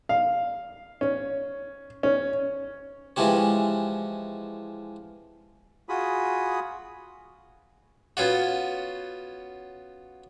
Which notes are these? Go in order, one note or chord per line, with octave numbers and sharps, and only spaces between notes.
F5
C#4
C#4
E3 F3 G#3 E4 G4 C#5
F4 F#4 G#4 B5 D#6
B3 C#4 F4 F#4